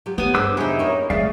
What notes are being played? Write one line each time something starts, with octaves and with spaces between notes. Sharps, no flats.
F#3 F4 G4
B3 C4 G#5
G2 G#4 B4 C5 D6 E6
F2 C3 F#3 D#4 E4 G4 G#4
F#2 A#3 C#5
C#3 E3 F#3 G#3 A3 D5 E5 F5